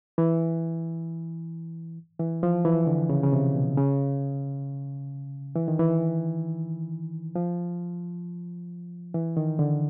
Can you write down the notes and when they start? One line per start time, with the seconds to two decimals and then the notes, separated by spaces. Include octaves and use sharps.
0.18 E3
2.19 E3
2.43 F3
2.65 E3
2.87 D3
3.10 C#3
3.23 C#3
3.33 C3
3.55 B2
3.77 C#3
5.55 E3
5.68 D#3
5.79 E3
7.35 F3
9.14 E3
9.37 D#3
9.59 D3